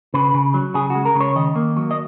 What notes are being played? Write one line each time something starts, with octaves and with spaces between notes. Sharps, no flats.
C#3 B4
C#3
F#3
C#3 G#4
F#4
G#3
A#4
C#3
C#5
D#3 D#5
A#3
F#3
D#5